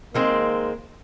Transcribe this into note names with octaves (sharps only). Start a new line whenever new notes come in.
D#3 G#3 A#3 C4